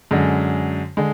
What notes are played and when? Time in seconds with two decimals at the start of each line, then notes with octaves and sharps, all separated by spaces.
0.11 F#2 D3 G#3
0.97 D3 G#3